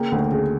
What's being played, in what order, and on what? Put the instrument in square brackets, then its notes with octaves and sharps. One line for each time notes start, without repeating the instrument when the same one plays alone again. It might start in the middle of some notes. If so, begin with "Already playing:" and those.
Already playing: [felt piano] C#3 A#3 G5
D2
C#3